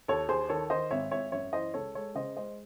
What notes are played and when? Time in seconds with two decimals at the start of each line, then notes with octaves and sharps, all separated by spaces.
0.08 D#2 A4 C#5
0.29 D#2 G#4 C5
0.49 D#3 A4 C#5
0.70 D#3 C5 D#5
0.91 G#1 C#5 E5
1.11 G#1 C#5 E5
1.32 F#2 C#5 E5
1.53 E3 C5 D#5
1.74 C#2 A4 C#5
1.95 G#3 A4 C#5
2.15 C#3 C5 D#5
2.37 G#3 C5 D#5